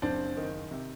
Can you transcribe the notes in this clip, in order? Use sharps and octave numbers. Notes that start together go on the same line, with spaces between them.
F#1 C4 D4
D#3
C3